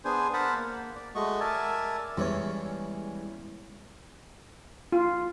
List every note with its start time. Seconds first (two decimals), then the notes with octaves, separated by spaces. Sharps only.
0.05 B3 D4 G#4 C5 G#5
0.34 A#4 C5 F#5 A5 B5
0.55 A#3
0.96 D5
1.15 G#3 A3 F#4 D#5 C#6
1.40 A#4 D5 E5 G#5 A5
2.17 E2 G3 G#3 C#4 E4 C#5
4.92 F4